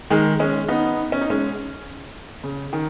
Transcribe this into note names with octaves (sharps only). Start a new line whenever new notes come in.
D#3 G#3
G#3 C#4
B3 D#4
C#4
D#4
G#3 C#4
C#3
D#3